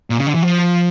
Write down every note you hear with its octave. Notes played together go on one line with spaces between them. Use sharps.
A#2
C#3
D3
E3
F3